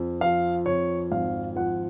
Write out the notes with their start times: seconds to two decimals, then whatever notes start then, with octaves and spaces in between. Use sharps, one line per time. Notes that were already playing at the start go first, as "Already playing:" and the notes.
Already playing: F2
0.21 F3 F5
0.66 F2 C#5
1.11 G#1 F5
1.56 F3 F#5